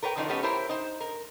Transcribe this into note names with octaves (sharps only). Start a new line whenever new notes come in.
A#4 B4 C#5 G5
D3 D#3 F3 D4 D#4
A3 B3 C#4 G4 B4 C#5
E4 G4 A#4 C5 C#5
D#4 C5
A#4